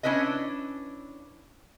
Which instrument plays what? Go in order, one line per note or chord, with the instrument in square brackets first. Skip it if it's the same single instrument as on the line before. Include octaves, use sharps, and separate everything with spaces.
[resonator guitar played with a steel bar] C#4 D4 E4 B4 D#5